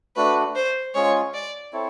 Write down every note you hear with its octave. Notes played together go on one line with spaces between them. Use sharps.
A3 D4 F#4 B4
C5
G#3 C#4 F4 C#5
D5
C4 E4 A4 C#5